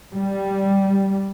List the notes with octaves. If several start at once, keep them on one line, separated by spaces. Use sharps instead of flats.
G3